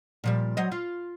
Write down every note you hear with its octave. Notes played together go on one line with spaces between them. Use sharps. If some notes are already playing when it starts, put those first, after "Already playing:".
A#2 F3 G3
F#3 C5 D#5
F4